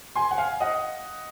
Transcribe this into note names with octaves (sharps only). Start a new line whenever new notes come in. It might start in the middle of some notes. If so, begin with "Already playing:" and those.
G#5 C6
F#5
F5 G#5
D#5 F#5